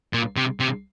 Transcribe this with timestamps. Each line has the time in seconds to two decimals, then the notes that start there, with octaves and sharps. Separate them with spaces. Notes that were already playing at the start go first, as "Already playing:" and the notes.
0.13 A#2
0.36 C3
0.60 C3